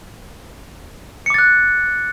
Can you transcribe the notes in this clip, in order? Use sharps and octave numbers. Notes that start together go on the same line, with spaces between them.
D6 F#6 A6 C#7